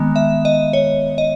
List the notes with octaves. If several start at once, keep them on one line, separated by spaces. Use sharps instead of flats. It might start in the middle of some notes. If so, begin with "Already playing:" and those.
Already playing: D#3 G#3 B3
E5
D#5
C#5
D#5